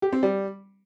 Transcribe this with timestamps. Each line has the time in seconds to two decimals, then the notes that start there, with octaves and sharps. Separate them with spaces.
0.02 G4
0.13 C4
0.23 G3